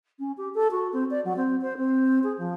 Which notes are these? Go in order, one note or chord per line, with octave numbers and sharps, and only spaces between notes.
C#4
G4
A4
F#4
C4
D5
F#3
C4
C5
C4
G#4
F3